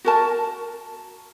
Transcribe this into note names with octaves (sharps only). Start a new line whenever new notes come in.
F#4 A#4 A5